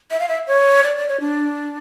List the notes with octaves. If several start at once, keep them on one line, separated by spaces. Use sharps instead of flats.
E5
F5
E5
C#5
D5
D5
C#5
D4